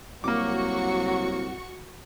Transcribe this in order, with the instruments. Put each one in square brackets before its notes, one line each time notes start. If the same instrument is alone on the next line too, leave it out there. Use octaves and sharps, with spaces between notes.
[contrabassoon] C2 [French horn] F#3 [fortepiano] A#3 D6 [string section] F#4 C#6